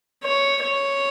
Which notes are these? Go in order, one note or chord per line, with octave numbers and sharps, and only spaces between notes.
C#5
C#5